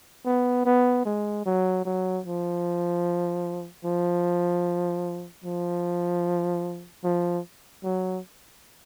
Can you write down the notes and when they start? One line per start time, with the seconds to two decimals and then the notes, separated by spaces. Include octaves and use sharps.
0.26 B3
0.66 B3
1.05 G#3
1.46 F#3
1.85 F#3
2.26 F3
3.85 F3
5.44 F3
7.04 F3
7.84 F#3